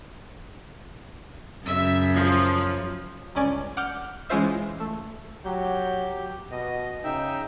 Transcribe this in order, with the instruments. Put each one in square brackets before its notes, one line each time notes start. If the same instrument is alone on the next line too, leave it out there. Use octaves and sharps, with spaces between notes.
[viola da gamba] F#2 C#3 [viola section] E5
[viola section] F3
[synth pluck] G1 C#2 C#4 D5 G#5
F#5 D6 F6 G6
E3 G#3 C#4 F4 C5 E5
A3
[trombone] F#3 [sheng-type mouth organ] G4 G6
[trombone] B2 [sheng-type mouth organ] D#5
[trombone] C#3 [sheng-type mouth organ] D#4 E5 G5